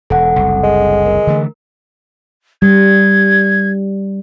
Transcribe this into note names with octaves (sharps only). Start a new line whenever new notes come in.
E1 A4 F#5
F#1 C2
G#3
A#4
D3 E3 A3
G3 G#6